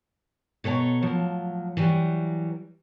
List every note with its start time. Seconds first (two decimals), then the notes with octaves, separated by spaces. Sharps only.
0.64 B2 A4 C#5 G#5 A#5
1.02 A2 F3 F#3
1.77 E3 F#3 G3